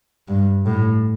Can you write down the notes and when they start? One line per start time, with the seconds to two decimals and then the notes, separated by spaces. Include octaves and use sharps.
0.28 G2
0.66 A2